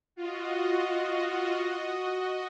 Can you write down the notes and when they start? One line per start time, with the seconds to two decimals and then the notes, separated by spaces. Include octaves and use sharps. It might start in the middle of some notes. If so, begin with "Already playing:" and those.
0.16 F4 F#4 D#5